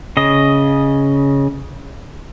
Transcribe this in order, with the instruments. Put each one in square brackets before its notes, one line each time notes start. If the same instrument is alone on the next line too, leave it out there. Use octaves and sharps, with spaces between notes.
[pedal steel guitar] C#3 D#5